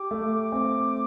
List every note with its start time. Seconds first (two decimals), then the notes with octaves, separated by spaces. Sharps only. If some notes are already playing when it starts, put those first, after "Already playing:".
Already playing: G4 D6
0.11 A3
0.52 C4